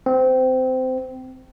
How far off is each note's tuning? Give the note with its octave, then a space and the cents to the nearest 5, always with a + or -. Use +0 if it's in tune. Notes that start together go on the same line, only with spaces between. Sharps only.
C4 -20